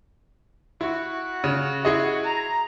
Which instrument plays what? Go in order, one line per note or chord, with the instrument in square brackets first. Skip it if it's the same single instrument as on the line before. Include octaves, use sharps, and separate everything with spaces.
[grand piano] E4 [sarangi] F#4
[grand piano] C#3
E4 G#4 D#5
[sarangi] A#5